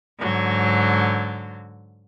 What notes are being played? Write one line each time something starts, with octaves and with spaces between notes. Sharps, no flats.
G#2 D3 F#3